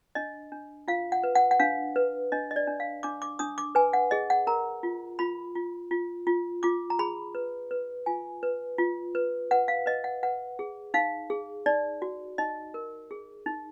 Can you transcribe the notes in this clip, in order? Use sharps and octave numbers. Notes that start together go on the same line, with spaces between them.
D4 D#5
D4
F4 F5
F#5
B4
F#5
F#5
D4 F5
B4
D4 D#5
D#5
D5
D4
F5
D4 D6
D6
D4 D#6
D6
B4 G#5
F#5
G#4 D#5
F#5
A#4 A#5
F4
F4 B5
F4
F4
F4
F4 D6
A#5
G#4 B5
B4
B4
F4 G#5
B4
F4
B4
B4 F#5
F5
B4 D#5
F#5
B4 F#5
G#4
D#4 F5
G#4
D#4 D5
F#4
D#4 D#5
A#4
G#4
D#4